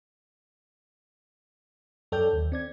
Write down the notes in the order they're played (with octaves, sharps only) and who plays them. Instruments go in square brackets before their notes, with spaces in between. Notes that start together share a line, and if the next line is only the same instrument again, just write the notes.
[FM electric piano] F#2 A4 C#5 D5 G5 G6
D#2
C4 D5 G#6